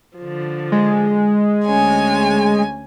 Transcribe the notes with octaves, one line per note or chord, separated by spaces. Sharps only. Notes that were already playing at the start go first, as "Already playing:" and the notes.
D3 F3
G#3
D2 C#4 G#5